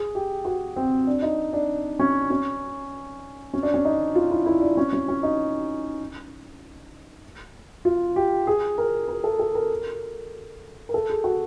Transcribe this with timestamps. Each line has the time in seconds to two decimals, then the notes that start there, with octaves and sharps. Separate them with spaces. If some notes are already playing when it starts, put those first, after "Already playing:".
Already playing: G#4
0.15 G4
0.45 F#4
0.76 C4
1.07 D4
1.22 D#4
1.53 D4
1.99 C#4
2.30 C#4
3.53 C#4
3.63 D4
3.74 C#4
3.85 D#4
4.15 F4
4.31 E4
4.46 E4
4.61 D4
4.77 C#4
4.93 C#4
5.08 C#4
5.23 D#4
7.85 F4
8.16 G4
8.47 G#4
8.78 A#4
9.08 A#4
9.24 A4
9.39 A4
9.55 A#4
10.89 A#4
10.94 A4
11.09 G#4
11.24 F#4